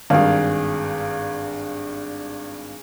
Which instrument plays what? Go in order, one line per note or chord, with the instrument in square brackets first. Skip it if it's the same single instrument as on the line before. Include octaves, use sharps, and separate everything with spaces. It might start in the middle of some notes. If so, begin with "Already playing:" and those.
[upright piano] G#1 G2 [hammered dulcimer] G#4 F5